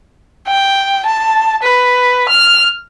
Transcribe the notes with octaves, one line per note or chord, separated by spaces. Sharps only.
G5
A5
B4
F6